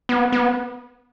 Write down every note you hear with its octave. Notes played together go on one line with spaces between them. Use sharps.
B3
B3